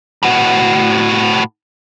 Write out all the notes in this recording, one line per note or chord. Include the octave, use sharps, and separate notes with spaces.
A2 F#4